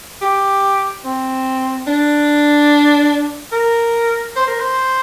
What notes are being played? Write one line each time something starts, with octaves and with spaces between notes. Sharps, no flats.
G4
C4
D4
A#4
C5
A#4
C5